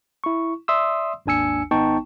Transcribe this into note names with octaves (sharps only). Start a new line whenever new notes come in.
E4 C#6
D5 E5 C6 D#6 E6
G#1 D#2 D4 G#5 E6 C#7
G#1 B3 D#4 G5 A5 C#6